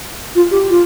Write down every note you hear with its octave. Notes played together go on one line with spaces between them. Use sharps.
F4
G4
F4